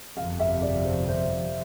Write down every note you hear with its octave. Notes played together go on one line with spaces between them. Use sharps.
G1 F2 C3 F5
E5
D5
C5
C5